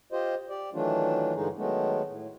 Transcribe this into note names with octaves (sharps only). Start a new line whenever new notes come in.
F4 G4 C5 D#5
G4 D5
D#3 E3 F#3 A3 D4 F4
G2 D3 E3 G#3 D#4 G#4
D#3 F#3 G#3 A3 B3
A2